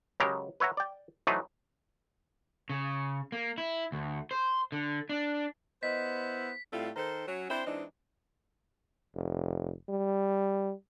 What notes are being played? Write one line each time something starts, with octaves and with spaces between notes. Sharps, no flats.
C#3 F#3 G#3 G4 A#4 A#5
B4 C#5 E5 F#5 A#5
D5 G5
E3 F#3 A3 D#4 B4 C5
C#3
A#3
E4
D2
C5
D3
D4
B3 E4 C5 D#5 B6
A2 G3 A3 C4 F4
D#3 A4 A#4 C5
F#3 C#4
C4 D4 E4 C5
E3 G#3 C4 D4 D#4
F1
G3